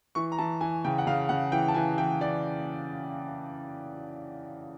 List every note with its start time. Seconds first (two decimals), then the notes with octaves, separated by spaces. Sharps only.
0.15 E3 C#6
0.32 A#5
0.38 E3 A5
0.61 E3 G#5
0.84 C#3 G5
0.98 F#5
1.07 C#3 F5
1.29 C#3 F#5
1.52 E3 G5
1.68 A5
1.74 E3 G#5
1.98 E3 G5
2.21 E3 D5